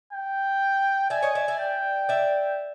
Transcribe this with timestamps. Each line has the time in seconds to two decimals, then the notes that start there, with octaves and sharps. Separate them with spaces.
0.12 G5
1.10 D5 E5 G#5
1.23 C#5 D#5
1.35 D5 E5
1.48 D5 E5
1.60 G5
2.09 D5 E5